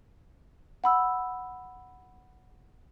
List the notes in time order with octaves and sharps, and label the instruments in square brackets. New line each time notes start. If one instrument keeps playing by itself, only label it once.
[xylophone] F#5 B5 E6